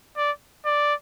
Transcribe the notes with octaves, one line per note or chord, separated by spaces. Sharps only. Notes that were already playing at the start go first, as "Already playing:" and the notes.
D5
D5